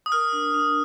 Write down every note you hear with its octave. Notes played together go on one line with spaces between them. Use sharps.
D#6
A#4 F6
D4
D4